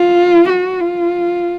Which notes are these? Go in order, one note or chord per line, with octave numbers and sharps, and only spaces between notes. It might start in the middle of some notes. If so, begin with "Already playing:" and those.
Already playing: F4
F#4
F4